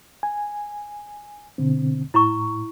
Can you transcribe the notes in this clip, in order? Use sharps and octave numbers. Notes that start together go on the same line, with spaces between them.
G#5
B2 D3 C4
A2 E4 A#5 C#6